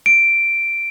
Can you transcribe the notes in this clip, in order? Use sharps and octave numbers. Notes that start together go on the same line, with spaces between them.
D7